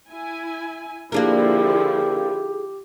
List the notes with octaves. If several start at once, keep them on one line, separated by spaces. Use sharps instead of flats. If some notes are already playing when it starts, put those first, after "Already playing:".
E4 G#5
D3 F3 A#3 D4 E4 G4 G#4 A#4